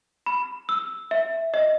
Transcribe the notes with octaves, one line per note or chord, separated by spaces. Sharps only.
B5
E6
E5
D#5